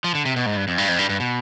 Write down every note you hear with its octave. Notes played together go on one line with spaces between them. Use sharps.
F3
D3
C3
B2
G#2
G2
F2
G2
F2
G2
G2
B2